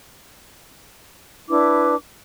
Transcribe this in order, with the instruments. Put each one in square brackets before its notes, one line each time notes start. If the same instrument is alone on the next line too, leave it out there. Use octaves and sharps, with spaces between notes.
[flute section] D4 E4 B4 D6